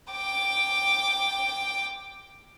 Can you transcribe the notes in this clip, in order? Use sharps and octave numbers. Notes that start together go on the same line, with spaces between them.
G5 D6